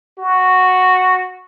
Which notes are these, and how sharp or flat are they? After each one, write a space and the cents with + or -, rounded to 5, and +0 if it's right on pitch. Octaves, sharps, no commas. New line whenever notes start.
F#4 -5